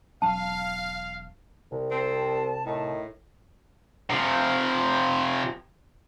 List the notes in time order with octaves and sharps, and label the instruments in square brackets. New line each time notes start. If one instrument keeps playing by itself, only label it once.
[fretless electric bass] E1 F#3 C#4 [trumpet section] F5 [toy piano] A5
[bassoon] C2 [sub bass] C3
[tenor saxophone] C4 [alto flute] A5
[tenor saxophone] A2 [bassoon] D#3
[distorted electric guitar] C3 F3